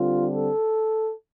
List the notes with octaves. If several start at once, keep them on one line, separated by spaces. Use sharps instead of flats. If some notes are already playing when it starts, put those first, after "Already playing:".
Already playing: D3 G3 C4 F4
A4